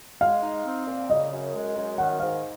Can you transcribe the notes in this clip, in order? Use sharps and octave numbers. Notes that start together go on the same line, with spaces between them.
G#3 F5
D#4
C4
A#2
C#3 D#5
F#2
G#3
F#2
D#3 F#5
G#2 F5